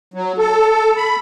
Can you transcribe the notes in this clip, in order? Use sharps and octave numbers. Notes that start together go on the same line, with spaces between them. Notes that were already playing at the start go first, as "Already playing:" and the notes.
F#3
A4
B5